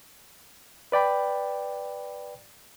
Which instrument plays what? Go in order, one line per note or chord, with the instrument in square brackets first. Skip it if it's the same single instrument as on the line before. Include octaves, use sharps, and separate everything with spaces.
[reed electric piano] B4 D5 G5 B5